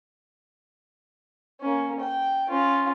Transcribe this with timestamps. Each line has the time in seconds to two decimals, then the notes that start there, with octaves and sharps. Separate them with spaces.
1.61 A#3 C#4
2.00 G5
2.48 C#4 F4